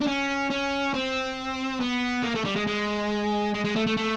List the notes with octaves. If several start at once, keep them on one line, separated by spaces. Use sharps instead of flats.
D4
C#4
C#4
C4
B3
A#3
A3
G3
G#3
G#3
G#3
G#3
A3
A3
A3